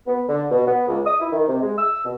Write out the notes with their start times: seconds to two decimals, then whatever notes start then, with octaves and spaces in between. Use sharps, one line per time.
0.06 B3
0.28 D3
0.50 B2
0.66 B3
0.87 C#2
1.05 D#6
1.20 E4
1.31 D#3
1.47 C3
1.61 G#3
1.77 E6
2.04 B2